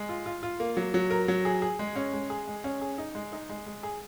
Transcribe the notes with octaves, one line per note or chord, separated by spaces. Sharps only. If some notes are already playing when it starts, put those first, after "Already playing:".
Already playing: G#3
F4
F4
F4
A#3
F#3
F#3
A#4
F#3
G#4
G#4
G#3
C#4
G#3
G#4
G#3
C#4
G#4
D#4
G#3
D#4
G#3
G#3
G#4